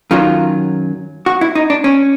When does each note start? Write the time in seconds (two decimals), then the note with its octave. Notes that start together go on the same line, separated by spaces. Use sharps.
0.11 F#2 D#3 F#3 F4
1.26 F#4
1.41 E4
1.55 D#4
1.70 D4
1.84 C#4